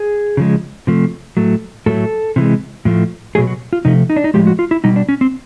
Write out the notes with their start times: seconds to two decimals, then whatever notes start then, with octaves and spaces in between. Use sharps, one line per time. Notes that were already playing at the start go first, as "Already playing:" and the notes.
Already playing: G#4
0.37 C#3 F3 G#3
0.87 C3 F3 A3
1.37 A2 F#3 A3
1.86 A2 F#3 A3 A4
2.36 C3 E3 G#3
2.85 A2 F3 A3
3.35 B2 F#3 A3 G#4
3.47 F#4
3.73 F4
3.85 C3 F3 A3 D#4
4.10 D#4
4.16 D4
4.24 D#4
4.34 A2 F3 G#3 G4
4.47 F#4
4.59 F4
4.71 E4
4.84 B2 G3 D#4
4.96 D4
5.09 C#4
5.21 C4